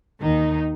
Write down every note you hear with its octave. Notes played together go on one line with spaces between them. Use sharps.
D#2 D#3 D#4